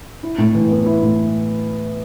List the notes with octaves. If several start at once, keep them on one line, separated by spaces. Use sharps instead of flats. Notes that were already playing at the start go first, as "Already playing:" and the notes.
E4
A2
E3
B3
E4
A2